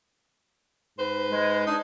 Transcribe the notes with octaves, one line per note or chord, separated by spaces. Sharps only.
G#2 B4 C5
G#3
D4 D#4 D#5